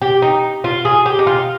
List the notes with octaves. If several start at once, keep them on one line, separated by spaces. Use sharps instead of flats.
G4
D#4
F4
G#4
G4
D#4
F4